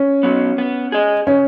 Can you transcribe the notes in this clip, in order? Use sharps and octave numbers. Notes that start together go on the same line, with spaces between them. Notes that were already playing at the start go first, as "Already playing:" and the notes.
Already playing: C#4
F#3 B3
B3
G#4 D#5
C#3 C#4